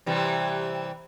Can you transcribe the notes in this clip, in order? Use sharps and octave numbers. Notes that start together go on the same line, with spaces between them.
C3 E3 G3